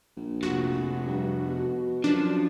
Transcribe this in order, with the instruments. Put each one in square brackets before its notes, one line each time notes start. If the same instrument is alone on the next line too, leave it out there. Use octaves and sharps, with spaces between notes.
[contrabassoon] A#1
[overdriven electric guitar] F2 C3 [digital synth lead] F#4
[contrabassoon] G2
B2
[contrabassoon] F#2 [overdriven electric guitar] F3 [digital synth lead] D4